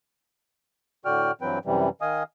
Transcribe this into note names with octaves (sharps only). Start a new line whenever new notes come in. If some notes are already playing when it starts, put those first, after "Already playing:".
A2 D3 F#4 D5 G5 F6
G2 E3 F#3 C4 B4 G5
F#2 C3 E3 G3
D#3 D#5 F5 G#5 D#6